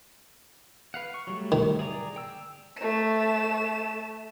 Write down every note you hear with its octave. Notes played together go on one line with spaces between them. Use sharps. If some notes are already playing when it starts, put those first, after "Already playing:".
B4 F5 F#5
C#6
F#3 G3 A3
D#3
G#4 D5 A#5
G5 E6
A3 E7